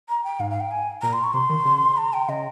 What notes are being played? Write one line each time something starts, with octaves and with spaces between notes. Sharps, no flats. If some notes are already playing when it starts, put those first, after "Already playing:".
A#5
G5
G#2 F5
F5
G5
G#5
A#2 A#5
C6
C#6
C3 C6
D#3
C#3
A#5
G5
C#3 D#5